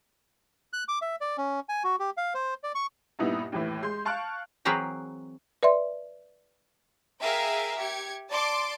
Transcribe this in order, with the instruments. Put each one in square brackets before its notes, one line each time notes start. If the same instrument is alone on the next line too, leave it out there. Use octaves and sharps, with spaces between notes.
[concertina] F#6
D6
E5
D5
C#4
G#5
F#4
G4
F5
C5
D5
C#6
[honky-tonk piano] G2 A#2 B3 D#4 E4
D#2 A2 E3
G#3 C6 G6
F5 A5 C#6 F6 F#6 D7
[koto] E3 F#3 C4 G#4 A#4 B4
[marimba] B4 D5 E5 C6
[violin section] G#4 A#4 E5 F5 G5
G4 G#6 C#7
D5 A5 C6 D6